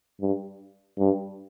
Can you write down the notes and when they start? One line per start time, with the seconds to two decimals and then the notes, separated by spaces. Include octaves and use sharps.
0.21 G2
0.99 G2